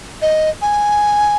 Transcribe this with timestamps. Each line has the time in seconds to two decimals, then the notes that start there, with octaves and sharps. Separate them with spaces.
0.22 D#5
0.62 G#5